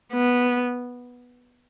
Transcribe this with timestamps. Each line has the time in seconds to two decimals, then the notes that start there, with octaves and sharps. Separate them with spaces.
0.13 B3